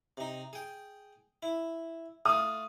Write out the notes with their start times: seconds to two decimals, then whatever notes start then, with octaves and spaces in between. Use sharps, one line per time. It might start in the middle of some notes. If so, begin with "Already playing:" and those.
0.17 C3 D#4
0.53 G#4 G5
1.43 E4
2.25 A3 F4 D#6